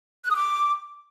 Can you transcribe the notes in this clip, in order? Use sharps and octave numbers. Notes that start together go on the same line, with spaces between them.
F#6
D#6
D6